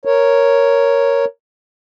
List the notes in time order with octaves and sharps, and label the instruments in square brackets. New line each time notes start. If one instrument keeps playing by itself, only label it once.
[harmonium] A#4 C#5